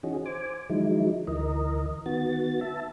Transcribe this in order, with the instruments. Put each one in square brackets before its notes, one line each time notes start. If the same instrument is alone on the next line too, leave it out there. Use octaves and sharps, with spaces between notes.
[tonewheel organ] E3 C#4 D#4 F#4 G#4
C5 G#5 D6
D#3 F3 F#3 G#3 D#4 E4
D2 E3 A#4 D#5
D#3 B3 F#4 A6
E5 A5